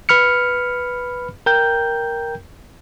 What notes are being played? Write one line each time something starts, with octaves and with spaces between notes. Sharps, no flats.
B4 B5 F6 C#7
A#4 G5 G6